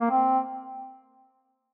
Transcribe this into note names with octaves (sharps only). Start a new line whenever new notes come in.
A#3
C4